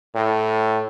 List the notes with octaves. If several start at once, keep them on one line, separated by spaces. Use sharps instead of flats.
A2